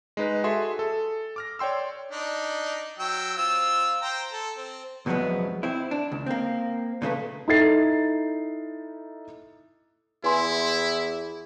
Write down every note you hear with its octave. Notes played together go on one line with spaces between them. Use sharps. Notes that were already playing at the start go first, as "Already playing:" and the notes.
G#3 D#4 B4
F#4 G#4 A4 E5 C6
A4
D6 F6 A#6
C#5 D5 G5 C6 E6
D4 D#4
F#3 G5 E6
C4 F4 E6
C5 G5 A#5
A4
C4
C2 F#2 F3 F#3 G#3 B3
C4 E4
D4
C#2
A#3 C4
A#2 C#3 A3 B4
D#4 E4 A4 A6 C7
E2 E4 B4 G#5 C6